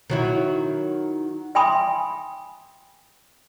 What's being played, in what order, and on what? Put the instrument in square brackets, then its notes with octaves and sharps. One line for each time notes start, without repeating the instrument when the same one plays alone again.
[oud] D#3 F#3 E4
[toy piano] E5 G5 G#5 B5 C6 D#6